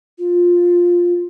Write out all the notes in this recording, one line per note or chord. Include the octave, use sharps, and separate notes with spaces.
F4